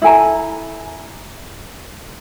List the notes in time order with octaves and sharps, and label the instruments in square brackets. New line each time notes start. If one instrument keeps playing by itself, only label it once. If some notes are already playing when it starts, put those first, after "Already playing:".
[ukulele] E4 A4 G#5 A#5